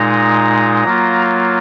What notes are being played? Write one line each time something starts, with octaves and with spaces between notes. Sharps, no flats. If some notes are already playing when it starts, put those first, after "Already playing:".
Already playing: A#2 G#3 D#4 A#5
F#3 A#3 F4